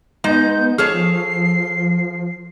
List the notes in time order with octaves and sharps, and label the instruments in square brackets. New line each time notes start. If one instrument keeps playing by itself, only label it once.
[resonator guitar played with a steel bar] G#3 [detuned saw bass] B3 [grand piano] D#4 D#5 [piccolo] G6
[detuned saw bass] F3 [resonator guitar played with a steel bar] G#4 A4 C#5 [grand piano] F6 [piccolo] C7